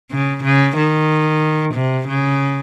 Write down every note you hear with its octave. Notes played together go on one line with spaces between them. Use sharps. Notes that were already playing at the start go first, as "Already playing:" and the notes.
C#3
C#3
D#3
C3
C#3